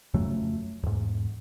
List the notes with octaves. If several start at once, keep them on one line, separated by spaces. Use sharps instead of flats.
F2 C#3 F#3 A3
E2 G#2